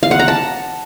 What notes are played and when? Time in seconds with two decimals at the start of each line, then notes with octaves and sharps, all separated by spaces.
0.03 F5
0.11 F#5
0.19 A#5
0.28 A5